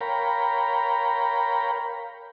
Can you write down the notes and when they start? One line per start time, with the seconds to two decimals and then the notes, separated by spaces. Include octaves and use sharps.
0.01 A#4 C#5 F5 G5 A#5 B5